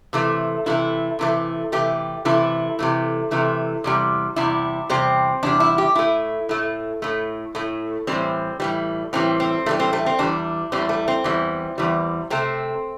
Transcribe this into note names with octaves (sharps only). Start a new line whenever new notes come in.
C3 E3 A3
C3 E3 A3 E4
C3 E3 A3
C3 E3 A3 G4
C3 E3 A3 E4
C3 E3 A3
C3 E3 A3
E2 C3 G3
E2 C3 G3 E4
E2 C3 G3 C4
E2 C3 G3 D4
E4
G4
A2 A3 E4
A2 A3
A2 A3
A2 A3
A2 E3 G3 C4
A2 E3 G3
A2 E3 G3 C4
C4
A2 E3 G3 A3
C4
A3
C4
E2 E3 G3 D4
E2 E3 G3 C4
A3
C4
E2 E3 G3
E2 E3 G3
C3 A3 C4